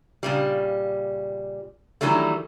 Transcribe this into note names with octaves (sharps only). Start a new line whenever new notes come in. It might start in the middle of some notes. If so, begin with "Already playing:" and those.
A#2 C#3 G3
D#3 E3 F#3 G3 A3